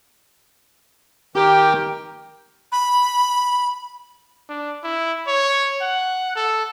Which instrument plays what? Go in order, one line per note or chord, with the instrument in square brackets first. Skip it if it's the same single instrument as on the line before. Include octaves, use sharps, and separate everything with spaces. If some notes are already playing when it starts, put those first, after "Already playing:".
[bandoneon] D#3 A#4 G5 [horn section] G4
[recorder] B5
[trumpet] D4
E4
C#5
F#5
A4